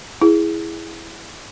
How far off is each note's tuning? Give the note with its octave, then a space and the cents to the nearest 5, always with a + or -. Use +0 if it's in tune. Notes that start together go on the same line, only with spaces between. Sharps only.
E4 +0 G#4 +0